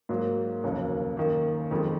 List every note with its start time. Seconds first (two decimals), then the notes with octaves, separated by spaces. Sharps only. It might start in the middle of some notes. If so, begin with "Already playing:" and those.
0.09 G#2 F#3 A#3
0.63 F1 D#2 C#3 F#3 A#3
1.17 F#2 D#3 A#3
1.71 F#1 F2 D#3 G#3